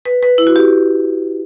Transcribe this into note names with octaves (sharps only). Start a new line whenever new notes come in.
B4
B4
E4
F#4
G4